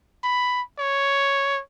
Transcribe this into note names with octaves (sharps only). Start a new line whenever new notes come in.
B5
C#5